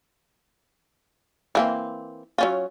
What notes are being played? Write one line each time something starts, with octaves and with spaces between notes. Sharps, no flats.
E3 A#3 C4
F#3 C#4 F4